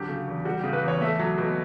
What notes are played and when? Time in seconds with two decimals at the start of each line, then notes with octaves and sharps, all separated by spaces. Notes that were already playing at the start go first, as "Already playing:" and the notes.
Already playing: D3 F#3 G4
0.09 C#3
0.28 E2
0.45 G3 F#4
0.59 C#3 G4
0.73 B4
0.83 E2
0.88 C#5
1.01 A3 E5
1.19 F#3
1.38 B2